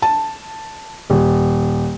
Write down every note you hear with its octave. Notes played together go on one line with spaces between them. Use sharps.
A5
D#1